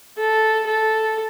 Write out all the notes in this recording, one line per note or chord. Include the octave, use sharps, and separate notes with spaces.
A4
A4